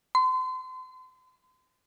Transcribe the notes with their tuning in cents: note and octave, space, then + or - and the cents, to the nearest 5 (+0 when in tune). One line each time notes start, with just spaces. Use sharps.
C6 -35